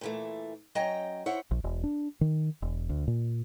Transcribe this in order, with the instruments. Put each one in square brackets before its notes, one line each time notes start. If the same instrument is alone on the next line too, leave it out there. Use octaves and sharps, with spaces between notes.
[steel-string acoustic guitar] A#2 E3 A3
F#3 C#4 D#5 G5 A#5
E4 C5 C#5 F#5
[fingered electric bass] A#1
E1
D4
D#3
E1
D2
A#2